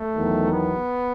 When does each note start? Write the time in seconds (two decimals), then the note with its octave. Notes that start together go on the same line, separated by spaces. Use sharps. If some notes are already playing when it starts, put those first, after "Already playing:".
Already playing: A3
0.14 E2 D#3 F#3
0.50 B3